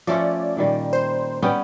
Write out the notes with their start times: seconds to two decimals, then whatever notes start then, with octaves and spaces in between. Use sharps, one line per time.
0.07 F3 A3 C#4 D5
0.57 A#2 D#3 G3
0.93 C5
1.42 G3 B3 C#4 G5